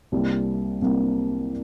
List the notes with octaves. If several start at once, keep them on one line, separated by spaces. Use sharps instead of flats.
C2 C3 G3 A#3
C2 C3 G3 A#3